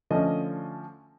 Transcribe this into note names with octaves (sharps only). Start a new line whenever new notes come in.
D3 F3 A3 C#4 D#5